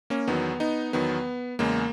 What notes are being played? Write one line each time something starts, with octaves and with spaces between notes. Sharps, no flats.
A#3 C#4
E2 D#3 F#3 B3
B3 D#4
E2 D#3 F#3 B3
E2 C#3 G#3 A#3